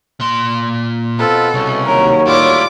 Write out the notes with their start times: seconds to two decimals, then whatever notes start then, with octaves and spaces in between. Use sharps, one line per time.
0.20 A#2 C6
1.19 B2 C4 F4 A4 B4
1.54 C2 C#3 C#4
1.86 D#2 F#3 A#4 C#5
2.27 A2 G3 E4 F4 D6